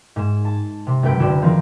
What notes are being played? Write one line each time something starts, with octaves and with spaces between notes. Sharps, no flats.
G#2 G#5 E7
A5
C3
F#1 C#2 B4 G5
F#1 D3 F#4 E7
D#3 F3 C4 D#4